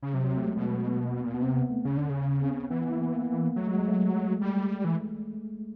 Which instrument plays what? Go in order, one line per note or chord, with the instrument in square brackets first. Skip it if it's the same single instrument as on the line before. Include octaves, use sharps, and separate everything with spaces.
[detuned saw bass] C#3
[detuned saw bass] C3 [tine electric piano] F#3
[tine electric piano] F#3
A3
G#3
[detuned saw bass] B2
[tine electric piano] A#3
[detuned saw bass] A#2 [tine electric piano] B3
[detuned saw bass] B2 [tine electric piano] B3
[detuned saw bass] C3 [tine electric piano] C4
[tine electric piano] B3
A3
[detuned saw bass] C#3 [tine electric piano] C#4
[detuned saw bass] D3
C#3
[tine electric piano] C4
B3
[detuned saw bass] E3 [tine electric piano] B3
[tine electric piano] B3
A#3
B3
A#3
B3
A#3
[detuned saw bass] F#3 [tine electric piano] A3
[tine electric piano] G#3
G#3
A3
[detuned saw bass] G3
E3